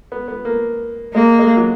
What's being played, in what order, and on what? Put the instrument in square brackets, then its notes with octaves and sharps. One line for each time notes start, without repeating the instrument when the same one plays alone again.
[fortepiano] B3
B3
A#3
[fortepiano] G#3 [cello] A#3
[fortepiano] G#3
F#3